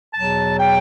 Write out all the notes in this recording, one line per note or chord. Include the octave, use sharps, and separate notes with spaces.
E2 B2 F#3 A5
G5